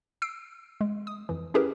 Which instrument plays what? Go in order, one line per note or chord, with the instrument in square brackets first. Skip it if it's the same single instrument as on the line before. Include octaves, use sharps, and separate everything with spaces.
[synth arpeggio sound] E6 C7 D7
G#3
D#6
F2 E3
C#4 E4 G4 G#4 A#4 B4